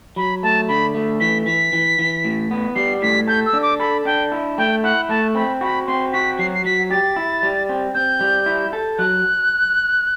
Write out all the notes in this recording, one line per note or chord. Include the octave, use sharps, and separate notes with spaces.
F#3 B5
A3 A5
D3 B5
A3
E3 B6
E3 B6
E3
E3
A2
B3
G3 C7
A2 B6
A4 G6
E6
D4
D6
A4 B5
D4 G5
E4
A3 G5
E4 F#5
A3 A5
C4 B5
F#4 B5
C4 C6
F#4 B6
F#3 C7
C7
F#3 B6
G4 A6
E4
G3
C4
C4 G6
G3
E4
A4
F#3 F#6